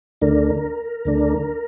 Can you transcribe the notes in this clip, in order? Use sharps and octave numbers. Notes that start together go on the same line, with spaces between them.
D2 D3 A3 D4 A#4
D2 D3 A3 D4